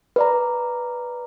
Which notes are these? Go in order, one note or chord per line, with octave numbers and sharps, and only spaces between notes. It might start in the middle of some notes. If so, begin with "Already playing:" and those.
B4 D5 A#5